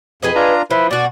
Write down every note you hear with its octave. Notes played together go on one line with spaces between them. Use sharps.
F2 G#4 B4 D#5
D4 F4 A#5
F3 E4 B4
B2 F#4 D5